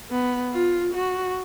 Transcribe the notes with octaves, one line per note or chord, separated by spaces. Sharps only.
B3
F4
F#4